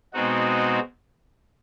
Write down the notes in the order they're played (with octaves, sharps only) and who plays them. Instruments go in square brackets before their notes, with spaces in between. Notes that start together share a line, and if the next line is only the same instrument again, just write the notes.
[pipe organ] B2 G#3 C4 D#4 F#4